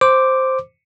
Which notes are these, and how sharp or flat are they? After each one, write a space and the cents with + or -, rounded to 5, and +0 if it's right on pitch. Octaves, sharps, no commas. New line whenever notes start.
C5 +0 D6 +0